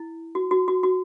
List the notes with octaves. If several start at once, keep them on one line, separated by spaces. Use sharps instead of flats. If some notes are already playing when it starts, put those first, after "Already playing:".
Already playing: E4
F#4
F#4
F#4
F#4